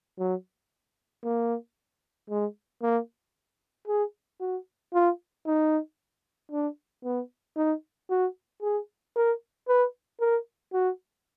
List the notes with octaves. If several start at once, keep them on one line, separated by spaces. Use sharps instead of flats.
F#3
A#3
G#3
A#3
G#4
F#4
F4
D#4
D4
B3
D#4
F#4
G#4
A#4
B4
A#4
F#4